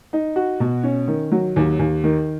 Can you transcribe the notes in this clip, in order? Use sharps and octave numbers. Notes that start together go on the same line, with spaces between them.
D#4
F#4
B2
C#4
D#3
F#3
D#2
D#2
D#3